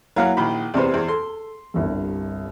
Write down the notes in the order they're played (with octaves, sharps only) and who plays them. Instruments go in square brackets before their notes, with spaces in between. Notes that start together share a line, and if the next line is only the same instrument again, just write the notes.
[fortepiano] F#3 F5 F#5 [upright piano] A#3 E4 F#4
[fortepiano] A#1 D#3 B5
[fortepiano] E2 C3 B3 [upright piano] C5 D5
[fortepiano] E2
[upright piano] A4 [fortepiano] C6
[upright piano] G1 C2 G2